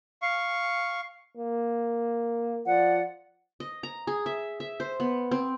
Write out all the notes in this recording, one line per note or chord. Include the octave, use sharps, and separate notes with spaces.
F5 C#6
A#3
F3 D5 F#5
D#5
A#5
G#4
E5
E5
C5
B3
C4